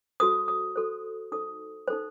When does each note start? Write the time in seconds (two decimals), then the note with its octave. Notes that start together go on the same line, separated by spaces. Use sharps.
0.20 F#4 A4 C5 D#6
0.48 D#6
0.76 F#4 A4 C5
1.32 D#4 A4 C5 D#6
1.87 D#4 A4 C5